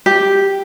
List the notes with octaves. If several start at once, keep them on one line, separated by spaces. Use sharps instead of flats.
G4